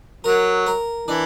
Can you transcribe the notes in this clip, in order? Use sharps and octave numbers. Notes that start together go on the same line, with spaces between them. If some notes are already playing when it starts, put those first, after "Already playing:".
F#3 A#4
A#4
E3 D4